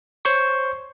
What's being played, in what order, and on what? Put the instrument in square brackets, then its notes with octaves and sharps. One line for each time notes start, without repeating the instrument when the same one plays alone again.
[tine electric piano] C5 C#5 C6 C#6